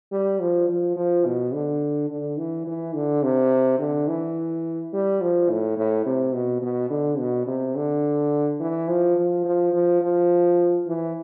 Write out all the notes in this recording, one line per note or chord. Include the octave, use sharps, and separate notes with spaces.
G3
F3
F3
F3
B2
D3
D3
E3
E3
D3
C3
D3
E3
G3
F3
A2
A2
C3
B2
B2
D3
B2
C3
D3
E3
F3
F3
F3
F3
F3
E3